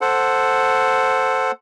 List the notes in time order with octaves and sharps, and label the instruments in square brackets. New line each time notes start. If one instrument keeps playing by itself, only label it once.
[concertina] A4 C5 F#5